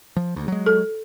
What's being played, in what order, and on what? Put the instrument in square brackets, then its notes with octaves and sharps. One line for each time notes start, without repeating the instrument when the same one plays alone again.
[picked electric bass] F3
D2
F#3 G#3
[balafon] A4